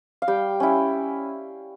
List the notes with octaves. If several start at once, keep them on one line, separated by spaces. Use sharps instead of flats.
F5
G3 G5
C#4 E4